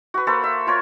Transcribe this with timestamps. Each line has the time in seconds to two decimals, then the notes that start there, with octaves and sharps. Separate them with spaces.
0.14 F#4 B4
0.27 A#3 A4 C5 B5
0.44 E5
0.67 F4 A#4 C#5